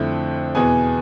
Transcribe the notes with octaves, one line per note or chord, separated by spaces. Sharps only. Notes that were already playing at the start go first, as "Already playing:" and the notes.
Already playing: F2 D3 A3 C4 E4
E2 B2 B3 G#4 G#5